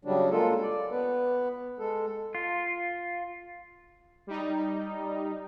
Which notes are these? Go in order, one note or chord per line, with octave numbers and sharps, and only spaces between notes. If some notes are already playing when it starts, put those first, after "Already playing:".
C#3 F#3 G3 D4
G#3 A#3 F4 A4
D5
B3 B4
G#3 A4
F4
G3 D#4